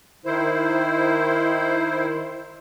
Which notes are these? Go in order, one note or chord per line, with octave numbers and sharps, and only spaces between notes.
D#3 E4 C5